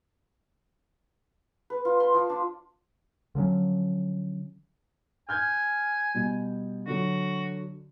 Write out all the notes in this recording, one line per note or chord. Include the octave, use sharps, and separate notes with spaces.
B4
F4
C6
F3
D4
D3 F3 F#3 C#4
G#5 F6 G6 G#6
B2 G3
D3 F#3 F#4